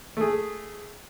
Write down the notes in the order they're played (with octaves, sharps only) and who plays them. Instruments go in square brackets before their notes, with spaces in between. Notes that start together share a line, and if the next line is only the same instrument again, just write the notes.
[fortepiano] A3 G#4